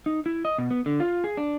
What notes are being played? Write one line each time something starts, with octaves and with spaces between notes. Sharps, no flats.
D#4
E4
D#5
B2
B3
D3
F4
G#4
D4